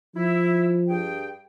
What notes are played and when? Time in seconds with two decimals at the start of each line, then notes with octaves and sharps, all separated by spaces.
0.15 F3 E4
0.89 G2 G#4 G5